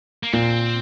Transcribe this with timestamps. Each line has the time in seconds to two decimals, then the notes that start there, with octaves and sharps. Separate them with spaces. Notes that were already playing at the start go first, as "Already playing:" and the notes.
0.23 A#3
0.33 A#2 C4